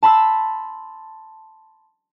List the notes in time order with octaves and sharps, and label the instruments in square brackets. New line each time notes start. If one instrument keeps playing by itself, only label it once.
[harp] A5 B5 C6 E6